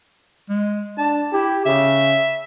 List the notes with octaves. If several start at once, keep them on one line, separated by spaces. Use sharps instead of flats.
G#3
D4 A5
E4 G4
C#3 E5